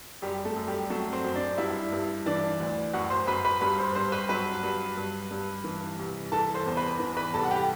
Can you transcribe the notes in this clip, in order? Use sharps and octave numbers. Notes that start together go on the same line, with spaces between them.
F#2 G3 G4
A3 A4
F#2
G3 G4
F#3 A3 A4
C4 C5
F#2
D4 D5
G2 E4 E5
G2
E3 D4 D5
D2
F#2 F#4 F#5
C5 C6
F#2 B4 B5
B4 B5
G2 B4 B5
C5 C6
G2 C5 C6
B4 B5
F#3 B4 B5
G2
G2
G2
E3
C2
E3 A4 A5
C5 C6
E2
B4 B5
E3
B4 B5
C2 A4 A5
F#5
G4 G5